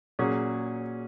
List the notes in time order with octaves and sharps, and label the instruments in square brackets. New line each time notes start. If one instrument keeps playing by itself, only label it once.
[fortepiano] A#2 F#3 C#4 G#4